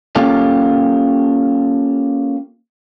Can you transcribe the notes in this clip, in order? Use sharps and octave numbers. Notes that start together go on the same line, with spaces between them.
A#3 C#4 F4 G4 A4 F5